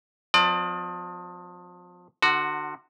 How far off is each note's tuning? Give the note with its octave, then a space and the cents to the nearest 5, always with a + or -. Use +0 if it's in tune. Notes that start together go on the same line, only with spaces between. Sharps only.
F3 +35 C4 -30 D5 +30
D3 +35 F#4 +0